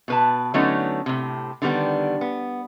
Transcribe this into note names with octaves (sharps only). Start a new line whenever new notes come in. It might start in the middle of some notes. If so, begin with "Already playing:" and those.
B2 B4 A5
D3 F#3 A3 B3 C#4 D#4
A2 C3
D3 D#3 G3 B3
B3